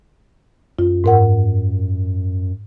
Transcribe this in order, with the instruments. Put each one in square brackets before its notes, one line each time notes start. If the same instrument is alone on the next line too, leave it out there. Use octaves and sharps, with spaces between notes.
[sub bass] F#2 [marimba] F4
[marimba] G#2 A#4 F#5